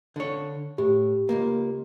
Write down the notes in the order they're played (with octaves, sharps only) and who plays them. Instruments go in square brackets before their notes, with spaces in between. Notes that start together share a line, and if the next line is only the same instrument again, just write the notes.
[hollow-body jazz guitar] D3 C#5
[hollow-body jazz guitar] A2 [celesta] G4
[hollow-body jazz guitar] C#2 F#2 A#3